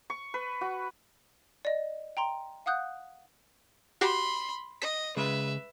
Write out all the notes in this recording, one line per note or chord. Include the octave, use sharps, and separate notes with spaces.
C#6
B4
F#4
D5 D#5
G5 A#5 C6
F5 F#5 D#6 F#6 G6
F#4 G4 B5 C6 C7
D#5 B6
C#3 G#3 B4 E5